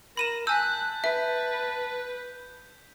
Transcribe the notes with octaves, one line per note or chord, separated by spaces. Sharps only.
A#4 B5 A#6 D#7 E7
G#5 A5 E6 F#6 G6 B6
B4 E5